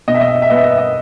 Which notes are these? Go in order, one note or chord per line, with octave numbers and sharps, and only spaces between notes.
B2 D#5
E5
D#5
E5
D#5
E5
B3 D#5
E5
D#5
E5
D#5